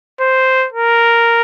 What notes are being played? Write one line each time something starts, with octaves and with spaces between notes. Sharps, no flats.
C5
A#4